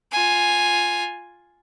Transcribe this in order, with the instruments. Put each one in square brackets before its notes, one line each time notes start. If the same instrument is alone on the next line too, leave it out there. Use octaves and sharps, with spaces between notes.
[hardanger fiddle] F4 G#5